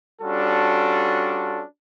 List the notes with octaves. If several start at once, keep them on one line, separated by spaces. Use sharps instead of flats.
G3 C#4 D4 F4 F#4 A4